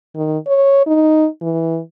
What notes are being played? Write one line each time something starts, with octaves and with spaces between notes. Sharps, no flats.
D#3
C#5
D#4
E3